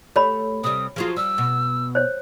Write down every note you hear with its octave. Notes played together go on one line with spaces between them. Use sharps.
A3 G4 C#5 B5
C3 G3 D#6
F3 F#3 F4 G#4
G3 E6
B2
C5 C#5